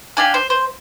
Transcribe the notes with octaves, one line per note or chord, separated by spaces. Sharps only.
D4 G4 F5 G#5
C5
C5